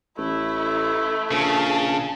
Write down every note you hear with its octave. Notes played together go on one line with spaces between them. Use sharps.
A1 A3 E4
A#1 C#3 A5